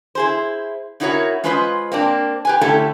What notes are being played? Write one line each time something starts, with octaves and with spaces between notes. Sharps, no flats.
E4 G#4 C5
C#4 D#4 E4 F#4 A#4 C#5
G#3 C#4 F4 B4 C5 D#5
A#3 C4 D4
G4 B4 G#5
D3 A3 C#4 E4 G4 A4